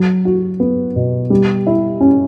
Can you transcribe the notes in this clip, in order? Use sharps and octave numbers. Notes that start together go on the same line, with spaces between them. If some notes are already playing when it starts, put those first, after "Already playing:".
Already playing: F#3
F#4
B3
B2
G3
E4
C#4